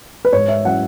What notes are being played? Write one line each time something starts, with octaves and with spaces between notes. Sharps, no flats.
B4
G#2 C#5
E5
F#3 C#4 E4 F#5